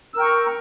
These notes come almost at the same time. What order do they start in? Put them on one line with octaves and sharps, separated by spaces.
E6 A#4 G5 C#6 A#5